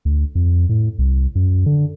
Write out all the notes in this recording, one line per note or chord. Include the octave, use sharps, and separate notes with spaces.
D2
F2
A2
C2
F#2
D3